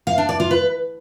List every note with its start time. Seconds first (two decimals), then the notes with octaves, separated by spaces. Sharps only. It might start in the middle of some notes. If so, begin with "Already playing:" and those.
0.07 F5
0.18 D4
0.29 D5
0.40 F4
0.51 B4